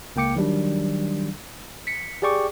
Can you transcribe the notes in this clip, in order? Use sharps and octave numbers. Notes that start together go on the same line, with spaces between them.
C#2 A#3 G5 D6 C#7
D#3 F#3 G3 D4
B6 C#7
G4 G#4 D5 G5 C#6 D6